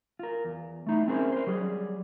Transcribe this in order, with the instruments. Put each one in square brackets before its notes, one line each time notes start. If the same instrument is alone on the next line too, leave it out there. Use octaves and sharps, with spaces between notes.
[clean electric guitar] F4 A#4
E2
A3 D#4 E4
C4 C#4 E4 G#4 A#4 C5
A#4 C5
F#3 G3 G#4